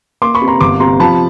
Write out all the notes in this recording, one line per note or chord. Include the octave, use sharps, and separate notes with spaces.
A#3 C6 D6
B5 C#6
C3
A#5 C6
G1 C6 D6
C3 A#5 C6
F3 A5 B5